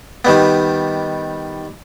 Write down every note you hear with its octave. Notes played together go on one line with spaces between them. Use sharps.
D#3 G3 B3